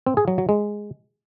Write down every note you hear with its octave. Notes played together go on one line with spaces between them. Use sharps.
C4
G#4
F#3
F#3
G#3